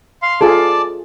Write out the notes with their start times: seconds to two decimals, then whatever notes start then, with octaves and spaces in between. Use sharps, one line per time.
0.22 F5 C6
0.41 F4 G#4 A4 D5 A5 D6